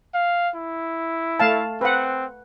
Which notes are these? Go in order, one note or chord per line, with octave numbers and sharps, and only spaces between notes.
F5
E4
A3 F5 A5
C4 B4 F#5